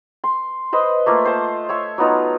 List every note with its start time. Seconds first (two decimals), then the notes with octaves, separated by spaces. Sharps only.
0.24 C6
0.73 B4 C5 D#5
1.06 A3 A#3 F4
1.25 C5 A5
1.69 C#5 E5 C#6
1.98 F#3 B3 D#4 F4